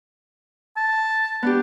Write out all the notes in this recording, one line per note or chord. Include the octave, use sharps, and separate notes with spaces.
A5
B3 D4 G4